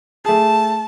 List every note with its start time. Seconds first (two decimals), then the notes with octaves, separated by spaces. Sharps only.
0.25 A3 G#4 A5